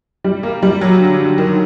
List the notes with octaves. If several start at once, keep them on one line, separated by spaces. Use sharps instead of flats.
G3
A#3
G3
F#3
D3
D3
D#3